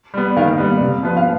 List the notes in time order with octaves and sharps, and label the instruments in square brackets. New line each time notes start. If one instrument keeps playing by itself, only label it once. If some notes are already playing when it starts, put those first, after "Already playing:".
[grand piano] G3 B3
[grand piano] D#3 [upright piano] F5
[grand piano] G3 B3
C3
F3 B3 F4 B4
[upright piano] F5